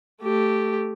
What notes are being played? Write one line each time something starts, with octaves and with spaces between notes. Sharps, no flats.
A3 G4